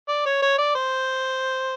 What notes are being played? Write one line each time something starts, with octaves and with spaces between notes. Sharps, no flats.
D5
C#5
C#5
D5
C5